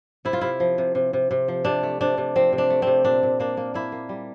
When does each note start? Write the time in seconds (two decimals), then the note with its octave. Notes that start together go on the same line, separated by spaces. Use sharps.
0.25 C3 E4
0.33 F4
0.41 C3 E4
0.60 F3
0.78 C3
0.95 C3
1.13 C3
1.31 C3
1.48 F3
1.65 C3 D4
1.83 A3
2.01 C3 D4
2.18 C3
2.36 F3 C4
2.53 C3
2.58 D4
2.70 A3
2.82 C3 C4
3.04 A#2 D4
3.23 A#2
3.40 A#3 D4
3.57 A#3
3.74 A#3 E4
3.92 A#3
4.09 G3